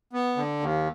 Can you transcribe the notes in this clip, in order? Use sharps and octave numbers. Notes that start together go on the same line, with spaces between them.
B3
D3
D#2